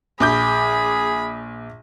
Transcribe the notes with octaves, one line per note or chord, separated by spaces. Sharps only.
A#1 G#4 B5 D6 G6